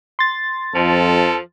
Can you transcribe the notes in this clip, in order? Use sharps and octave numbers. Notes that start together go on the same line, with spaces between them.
C6 A6
F2 F3 A4